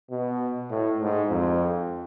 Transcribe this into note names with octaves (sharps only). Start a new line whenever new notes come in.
B2
A2
G#2
F2